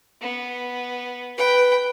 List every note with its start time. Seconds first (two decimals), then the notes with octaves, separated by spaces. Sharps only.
0.22 B3
1.38 B4 G5